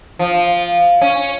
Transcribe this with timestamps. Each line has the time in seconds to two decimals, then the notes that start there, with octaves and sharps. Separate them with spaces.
0.19 F3
1.01 C#4